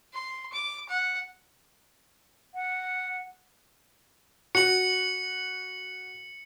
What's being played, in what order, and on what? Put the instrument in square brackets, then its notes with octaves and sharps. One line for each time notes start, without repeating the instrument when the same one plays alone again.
[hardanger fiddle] C6
D6
F#5
[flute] F#5
[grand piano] F#4 [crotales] C#7 F#7